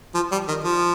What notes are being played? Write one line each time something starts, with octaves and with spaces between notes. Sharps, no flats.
F3
G3
D#3
F3